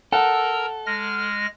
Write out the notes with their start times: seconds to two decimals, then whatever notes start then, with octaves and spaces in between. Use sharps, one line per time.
0.12 A4 A#4 F#5 A#5 E6
0.86 G#3 F6 A#6